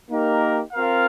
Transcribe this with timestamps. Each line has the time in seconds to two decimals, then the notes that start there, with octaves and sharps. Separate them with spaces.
0.10 A#3 D#4 G4 A#4
0.73 C4 F4 A#4 F5